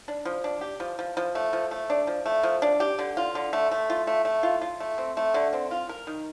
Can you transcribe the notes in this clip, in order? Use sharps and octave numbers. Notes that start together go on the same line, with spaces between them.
D4
F3
D4
G4
F3
F3
F3
A3
F3
A3
D4
F3
A3
F3
D4
G4
D3
F4
D3
A3
A3
F4
A3
A3
F4
F4
A3
C4
A3
D3
C4
F4
A#4
D#3